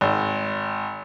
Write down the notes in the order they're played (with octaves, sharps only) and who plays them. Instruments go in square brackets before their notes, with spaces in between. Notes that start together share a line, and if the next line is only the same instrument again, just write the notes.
[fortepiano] G#1